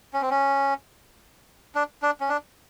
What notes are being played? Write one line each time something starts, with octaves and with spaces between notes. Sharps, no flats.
C#4
C4
C#4
D4
D4
C#4
D4